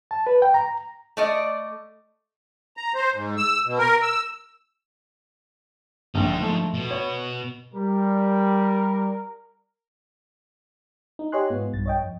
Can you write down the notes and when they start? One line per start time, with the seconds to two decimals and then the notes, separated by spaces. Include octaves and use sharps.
0.11 A5
0.27 B4
0.42 G5
0.54 A#5
1.17 A3 D5 D#5
2.77 A#5
2.95 C5
3.14 G#2
3.37 E6
3.66 B2
3.79 A#4
4.02 E6
6.15 A#1 A#2 G#3 D#4
6.40 F3 A3
6.74 B2
6.91 C#5
7.74 G3 A#4
11.19 D#4
11.32 G4 C#5 D#5 G#5 C6 F#6
11.50 G#2 B3 F4
11.73 B1 G2 A6
11.86 C#5 D#5 G5
12.01 F2